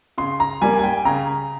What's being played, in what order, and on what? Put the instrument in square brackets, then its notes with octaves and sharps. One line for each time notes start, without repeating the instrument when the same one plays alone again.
[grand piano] C#3 C6
A#5
G3 A#3 G#5
G#5
G5
C#3 A#5